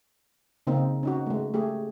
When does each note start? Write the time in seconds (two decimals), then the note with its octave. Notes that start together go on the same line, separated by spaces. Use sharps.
0.67 C#3 A#3 C4 D#4
1.03 C#4 D#4 F#4
1.26 G#3 A3
1.54 A3 G4 G#4